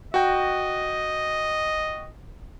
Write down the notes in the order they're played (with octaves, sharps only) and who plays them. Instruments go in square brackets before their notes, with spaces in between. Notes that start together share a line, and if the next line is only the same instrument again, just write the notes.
[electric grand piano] F#4 G5 [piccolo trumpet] D#5